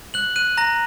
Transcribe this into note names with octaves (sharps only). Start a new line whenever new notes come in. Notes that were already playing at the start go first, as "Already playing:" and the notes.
F#6 F#7
F#6 D#7
A#5 A#6